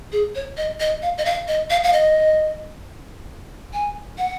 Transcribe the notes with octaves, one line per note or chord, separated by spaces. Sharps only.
G#4
C#5
D#5
D#5
F5
D#5
F5
D#5
F5
F5
D#5
G#5
F#5